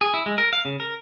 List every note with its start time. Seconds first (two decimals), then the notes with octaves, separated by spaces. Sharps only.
0.01 G#4
0.14 E4
0.26 G#3
0.38 A#4
0.53 F5
0.65 C#3
0.80 A#4